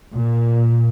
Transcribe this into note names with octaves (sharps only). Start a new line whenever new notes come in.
A#2